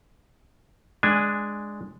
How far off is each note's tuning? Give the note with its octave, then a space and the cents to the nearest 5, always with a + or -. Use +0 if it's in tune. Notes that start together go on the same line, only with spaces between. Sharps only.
G#3 +0 D4 +5 G#5 -10